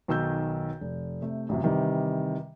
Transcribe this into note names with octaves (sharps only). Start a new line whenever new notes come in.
B1 D#3 E6 G6
F1
C3 A3
A1 F#2 C3
C3 D#3 E3 G3